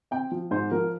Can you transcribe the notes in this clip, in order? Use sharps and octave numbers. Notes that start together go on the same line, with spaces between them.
C4 G5
F3
G#2 C5
F3 A#4